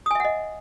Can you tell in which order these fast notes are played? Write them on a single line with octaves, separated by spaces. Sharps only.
D#6 G#5 E5 F#5 D#5